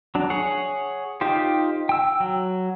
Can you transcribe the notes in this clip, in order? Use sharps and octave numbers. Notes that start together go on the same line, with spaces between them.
F#3 D4
G#4 C#5 F#5
D#4 F4 G4 C5
G5 E6
F#3